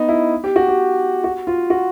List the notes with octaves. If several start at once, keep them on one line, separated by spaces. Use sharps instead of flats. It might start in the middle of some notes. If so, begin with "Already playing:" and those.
Already playing: B3 D#4
E4
G4
F#4
G4
F#4
F4
F#4